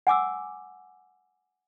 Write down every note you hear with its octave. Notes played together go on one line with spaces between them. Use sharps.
F#5 G#5 D6 E6